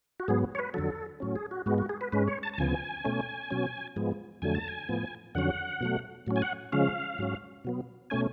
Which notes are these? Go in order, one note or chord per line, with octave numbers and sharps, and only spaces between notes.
F#4
G#2 F#3 B3 G#4
C#5
B4
F2 D3 F#3 A4
A2 F#3 C#4
G#4
F#4
G#2 G#3 B3 F#4
F#4
G#4
B4
G#2 G#3 C#4 B4
C#5
A5
A5
D2 C#3 F3 B3 G#5
B2 A3 C#4
B2 F#3 C#4
G#2 F3 G#3 B3
F2 D3 F#3 A3 G#5
A5
G#5
A2 F3 B3
F2 D3 F#3 C#4 F#5
B2 F#3 A3
A2 F#3 C#4
G#5
F#5
C#3 F3 G#3 C#4 F5
G#2 F#3 C#4
B2 F#3 B3
B2 A3 C#4 G#5